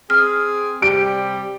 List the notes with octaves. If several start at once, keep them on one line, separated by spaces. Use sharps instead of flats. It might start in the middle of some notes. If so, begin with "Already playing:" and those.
C4 G#4 F6
C3 G3 G4 D7